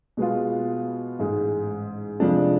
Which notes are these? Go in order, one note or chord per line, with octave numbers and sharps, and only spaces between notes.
B2 G#3 B3 F4
A1 G#2 G#3
F1 F2 F3 G#3 D4